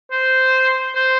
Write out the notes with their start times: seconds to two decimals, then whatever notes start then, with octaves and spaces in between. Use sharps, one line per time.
0.11 C5
0.95 C5